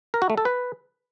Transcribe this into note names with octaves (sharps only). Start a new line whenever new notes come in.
A#4
F#4
A3
A4
B4